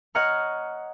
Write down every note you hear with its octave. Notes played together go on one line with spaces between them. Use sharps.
C#5 D#5 F#5 A#5 F6